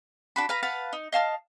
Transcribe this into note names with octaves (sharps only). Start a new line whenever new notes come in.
D4 F#4 B5
B4 F5 A#5
B4 F5 F#5 A5
D#4
D#5 F5 A5 F6